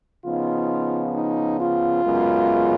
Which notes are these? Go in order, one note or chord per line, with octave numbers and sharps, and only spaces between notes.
C#3 F3 B3 D#4 F4
D#4
F4
F#2 C#3 G#3 B3